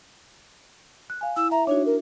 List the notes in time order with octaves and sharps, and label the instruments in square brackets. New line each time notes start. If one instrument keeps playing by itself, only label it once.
[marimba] F#6
F5 G#5
[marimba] E4 [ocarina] E6
[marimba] E5 [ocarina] A#5
[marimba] D4 D#4 F#4 [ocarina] C#5
[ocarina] A#4